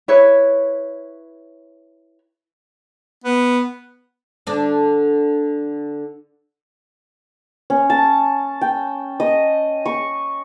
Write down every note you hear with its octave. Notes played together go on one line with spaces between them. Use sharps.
E4 B4 C#5
B3
D3 D4
C#4
A5
G5
D#5
C#6